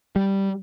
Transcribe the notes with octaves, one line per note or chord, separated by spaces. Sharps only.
G3